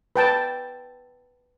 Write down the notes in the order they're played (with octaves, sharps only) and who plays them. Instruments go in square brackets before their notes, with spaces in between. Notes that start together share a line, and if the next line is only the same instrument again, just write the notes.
[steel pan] B4 G5 A5